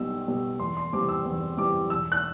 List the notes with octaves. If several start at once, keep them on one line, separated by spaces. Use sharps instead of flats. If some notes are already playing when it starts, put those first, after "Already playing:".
Already playing: B1 B2 G3 E6
B2 G3
E2 C6
C6
C3 E3 G3 C4 D6
E6
E2
C3 E3 G3 C4 D6
E1 E6
F#6